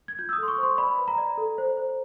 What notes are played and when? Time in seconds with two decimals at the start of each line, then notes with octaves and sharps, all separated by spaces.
0.08 G#6
0.19 F4 G6
0.29 E6
0.33 D#6
0.38 A4 C6
0.48 C#6
0.58 C5 C6
0.78 D5 B5
0.99 B4
1.08 A#5
1.18 D5
1.37 A4
1.58 C5
1.77 C5